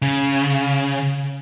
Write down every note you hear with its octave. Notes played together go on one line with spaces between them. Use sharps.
C#3